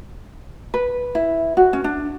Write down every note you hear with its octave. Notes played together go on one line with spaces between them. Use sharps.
B4
E4
F#4
C#4
D4